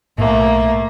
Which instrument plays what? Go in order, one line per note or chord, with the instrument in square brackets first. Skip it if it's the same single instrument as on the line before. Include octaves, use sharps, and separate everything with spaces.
[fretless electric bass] B1 A2 [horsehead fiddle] A3 [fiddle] A#3